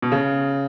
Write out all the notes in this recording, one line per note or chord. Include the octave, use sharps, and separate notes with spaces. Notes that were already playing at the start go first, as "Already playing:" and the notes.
B2
C#3